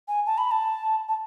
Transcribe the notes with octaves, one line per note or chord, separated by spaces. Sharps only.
G#5
A5
B5
A5
A5